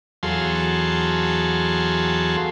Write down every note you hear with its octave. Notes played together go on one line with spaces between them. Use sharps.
E2 F#3 G#4 A4 F5 C6